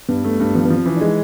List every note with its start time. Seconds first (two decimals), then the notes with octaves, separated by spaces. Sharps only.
0.09 G2 B3
0.24 A3
0.40 G2
0.55 F3 B3
0.65 F3 B3
0.75 C4
0.86 E3 C#4
0.96 G#3 D4
1.06 D#4